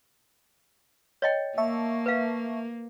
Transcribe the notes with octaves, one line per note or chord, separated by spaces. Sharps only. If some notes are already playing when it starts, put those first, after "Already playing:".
C#5 D#5 G5
A#3 E5 A5 C#6
B4 F5